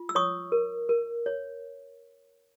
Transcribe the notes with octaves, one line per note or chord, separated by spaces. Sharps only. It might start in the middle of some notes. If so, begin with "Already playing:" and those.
Already playing: F4
E6
C#5 C#6 D#6
A#4
A#4
C#5